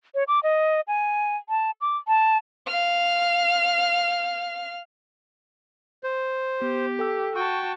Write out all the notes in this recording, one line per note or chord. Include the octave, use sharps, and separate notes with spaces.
C#5
D6
D#5
G#5
A5
D6
A5
F5 F6
C5
B3 G4
A4 G5 E6
F#4 G5 A5 C#6